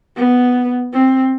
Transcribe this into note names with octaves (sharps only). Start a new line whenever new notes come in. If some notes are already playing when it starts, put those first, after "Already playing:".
B3
C4